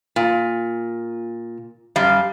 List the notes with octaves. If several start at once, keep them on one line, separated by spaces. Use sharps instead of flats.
A#2
F#2 G3 F5